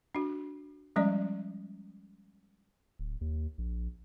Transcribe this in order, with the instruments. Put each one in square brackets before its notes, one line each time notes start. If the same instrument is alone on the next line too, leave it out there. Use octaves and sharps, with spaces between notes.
[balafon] D4 F#4
F3 G3 G#3 C#4 D5 D#5
[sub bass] D1
D#2
A#1